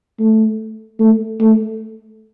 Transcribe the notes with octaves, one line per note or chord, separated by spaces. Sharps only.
A3
A3
A3